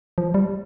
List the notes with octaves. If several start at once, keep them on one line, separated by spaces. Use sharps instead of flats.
F3
G3